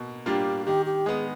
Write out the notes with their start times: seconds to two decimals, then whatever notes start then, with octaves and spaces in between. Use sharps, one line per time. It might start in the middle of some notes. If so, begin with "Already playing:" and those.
Already playing: B2 A#3
0.26 G3 A#3 D4 F4 G4
0.66 D#3 G4
0.86 G4
1.06 G#3 B3 G#4